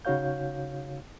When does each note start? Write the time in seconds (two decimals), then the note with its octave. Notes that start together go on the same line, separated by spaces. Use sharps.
0.05 C#3 D#4 F#4 C#5 F5 G6